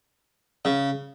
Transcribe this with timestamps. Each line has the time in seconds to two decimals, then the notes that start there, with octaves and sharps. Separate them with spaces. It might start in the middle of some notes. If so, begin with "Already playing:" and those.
0.65 C#3